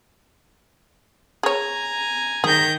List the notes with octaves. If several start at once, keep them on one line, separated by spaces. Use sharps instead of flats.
G#4 C#5 G#5 A#5
D#3 G#4 G6 A#6